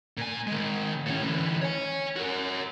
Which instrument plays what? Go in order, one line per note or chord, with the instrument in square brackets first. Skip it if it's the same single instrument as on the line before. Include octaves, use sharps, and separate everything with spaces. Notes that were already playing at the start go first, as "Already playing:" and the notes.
[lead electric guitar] A#2 G#5
D#3 G#3
A2 C#4
D3 E3
C#5 G#5
F#4 A#4